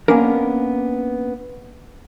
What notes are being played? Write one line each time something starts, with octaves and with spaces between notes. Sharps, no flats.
A#3 B3 C#4 D4 A#4